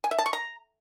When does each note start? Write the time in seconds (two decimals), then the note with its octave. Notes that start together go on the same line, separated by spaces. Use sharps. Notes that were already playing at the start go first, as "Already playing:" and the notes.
0.04 G#5
0.11 E5
0.18 A5
0.26 C#6
0.33 A#5